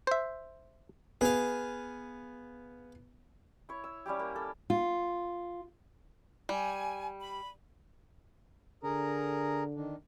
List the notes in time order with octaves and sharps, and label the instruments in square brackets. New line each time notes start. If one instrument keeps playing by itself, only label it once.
[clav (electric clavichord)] C5 E5
[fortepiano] B3 [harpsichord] G#4 F5
[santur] E4 C#5
E6
G3 C#4 E4 G4
A#3
A4
[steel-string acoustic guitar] F4
[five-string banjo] G3 [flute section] G#5
[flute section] B5
[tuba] D3 [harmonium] G#4 A#4 A#5
[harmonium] D#3 D4